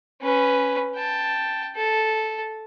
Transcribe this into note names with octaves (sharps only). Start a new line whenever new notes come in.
C#4 B4
G5 A5
A4